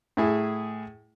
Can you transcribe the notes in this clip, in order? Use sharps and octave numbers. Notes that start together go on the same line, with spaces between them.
A2 E4 G#4